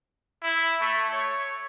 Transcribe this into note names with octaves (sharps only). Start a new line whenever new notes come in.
E4
A3
C#5